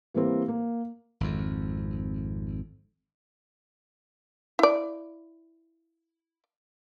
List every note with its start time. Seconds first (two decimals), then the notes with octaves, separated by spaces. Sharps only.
0.14 E3 G3 A#3 C4
0.48 A#3
1.21 G#1 F2
4.59 E4 D5